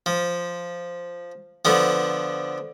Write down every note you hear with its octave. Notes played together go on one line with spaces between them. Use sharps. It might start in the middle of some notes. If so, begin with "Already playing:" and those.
F3
D3 F3 B3